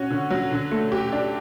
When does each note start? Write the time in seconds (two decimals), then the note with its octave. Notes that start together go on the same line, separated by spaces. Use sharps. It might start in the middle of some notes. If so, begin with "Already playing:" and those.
Already playing: C#4 F#4
0.10 D3
0.30 F#3
0.51 D3
0.71 A3
0.92 G4
1.13 D4